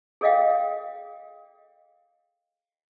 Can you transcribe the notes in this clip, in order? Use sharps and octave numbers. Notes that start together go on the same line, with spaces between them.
G#4 A4 D5 D#5 F5 G5